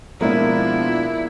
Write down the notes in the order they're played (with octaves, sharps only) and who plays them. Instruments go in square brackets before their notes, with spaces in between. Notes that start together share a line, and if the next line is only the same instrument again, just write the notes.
[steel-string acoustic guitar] B2 G#3 [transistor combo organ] F3 [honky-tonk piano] A#3 B3 D4 [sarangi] E4